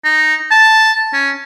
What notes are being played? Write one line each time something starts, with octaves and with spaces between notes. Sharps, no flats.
D#4
A5
C#4